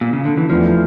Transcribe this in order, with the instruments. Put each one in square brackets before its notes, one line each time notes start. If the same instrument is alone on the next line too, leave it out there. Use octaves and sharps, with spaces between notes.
[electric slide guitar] A#2
C#3
D3
E3
[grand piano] E2 E3 A3 D4 [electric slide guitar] F3